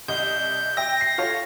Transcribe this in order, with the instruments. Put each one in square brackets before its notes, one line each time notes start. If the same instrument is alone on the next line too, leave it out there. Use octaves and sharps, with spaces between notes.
[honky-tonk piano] C2 D#5 [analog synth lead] G6
[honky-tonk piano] E5 G5 [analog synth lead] A#6
[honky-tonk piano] C7
F4 A4 C#5